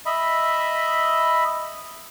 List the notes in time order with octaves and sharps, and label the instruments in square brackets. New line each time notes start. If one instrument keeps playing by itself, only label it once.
[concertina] D#5 E5 B5